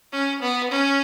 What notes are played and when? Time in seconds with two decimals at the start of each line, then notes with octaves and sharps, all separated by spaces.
0.12 C#4
0.41 B3
0.71 C#4